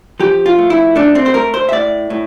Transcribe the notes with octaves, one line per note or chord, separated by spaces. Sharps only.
F3 G4
F4
A3
E4
A3 D4
C4
C5
A3 A#4
C5
E5
A2 D5
A2